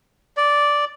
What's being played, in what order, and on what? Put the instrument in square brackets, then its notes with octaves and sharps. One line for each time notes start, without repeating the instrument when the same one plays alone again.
[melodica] D5